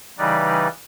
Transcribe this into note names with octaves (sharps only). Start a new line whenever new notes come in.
C#3 E3 G3 D#4 B4 D5